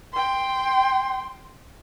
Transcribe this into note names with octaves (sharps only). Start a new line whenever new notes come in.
G5 C6